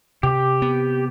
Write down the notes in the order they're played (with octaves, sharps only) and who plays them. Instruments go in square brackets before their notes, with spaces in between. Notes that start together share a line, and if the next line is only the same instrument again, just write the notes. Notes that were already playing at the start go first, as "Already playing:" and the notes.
[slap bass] C3 [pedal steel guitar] G4
[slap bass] B3